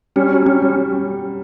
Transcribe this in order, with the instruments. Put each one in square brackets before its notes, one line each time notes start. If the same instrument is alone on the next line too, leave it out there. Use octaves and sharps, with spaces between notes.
[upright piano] G3 [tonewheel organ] C#4
[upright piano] F#3
[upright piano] G3 [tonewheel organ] C#4
[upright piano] G3